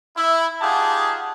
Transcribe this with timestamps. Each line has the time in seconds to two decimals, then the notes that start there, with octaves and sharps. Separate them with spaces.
0.17 E4
0.61 D#4 F4 G4 G#4 F#5 A5